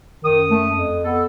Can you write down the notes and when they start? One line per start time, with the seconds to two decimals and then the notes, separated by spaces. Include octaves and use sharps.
0.24 F#2 D#3 D#6
0.51 A3
0.74 F2
1.04 B3 A4